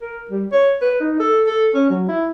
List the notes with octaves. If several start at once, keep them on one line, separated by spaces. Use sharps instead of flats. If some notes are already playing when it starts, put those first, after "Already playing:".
A#4
G3
C#5
B4
D#4
A4
A4
C#4
F#3
E4